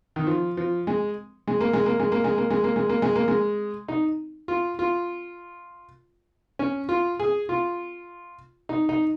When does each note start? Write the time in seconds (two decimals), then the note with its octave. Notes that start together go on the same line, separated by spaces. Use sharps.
0.16 D#3
0.27 F3
0.57 F3
0.87 G#3
1.48 G#3
1.61 A#3
1.73 G#3
1.86 A#3
2.00 G#3
2.12 A#3
2.24 G#3
2.38 A#3
2.50 G#3
2.64 A#3
2.76 G#3
2.89 A#3
3.02 G#3
3.16 A#3
3.28 G#3
3.89 D#4
4.48 F4
4.79 F4
6.59 C#4
6.89 F4
7.20 G#4
7.49 F4
8.69 D#4
8.89 D#4